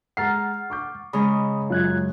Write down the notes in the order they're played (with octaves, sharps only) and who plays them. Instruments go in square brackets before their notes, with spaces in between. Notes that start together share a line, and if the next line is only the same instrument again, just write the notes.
[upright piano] G#3 A#5 C7 [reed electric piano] F#5 F6 A6
[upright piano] C#6 D6 G6
[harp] C#3 G#3 A#5 [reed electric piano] B5 D#6
[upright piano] F#2 [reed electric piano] F4 F#6 G#6